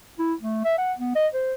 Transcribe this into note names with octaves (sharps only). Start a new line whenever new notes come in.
E4
A3
E5
F#5
B3
D#5
C5